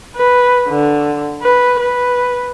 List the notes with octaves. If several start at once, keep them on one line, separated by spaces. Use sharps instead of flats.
B4
D3
B4
B4